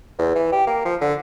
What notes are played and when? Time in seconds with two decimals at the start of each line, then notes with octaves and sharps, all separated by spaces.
0.18 E2
0.35 E3
0.52 G4
0.67 A#3
0.85 F3
1.01 D3